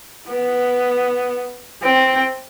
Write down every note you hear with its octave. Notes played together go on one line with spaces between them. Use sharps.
B3
C4